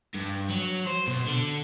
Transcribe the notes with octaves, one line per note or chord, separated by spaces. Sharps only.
G2
F#3
C5
B2
D3